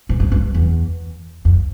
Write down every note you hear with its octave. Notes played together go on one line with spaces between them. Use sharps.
G#2
G2
G2
E2
F2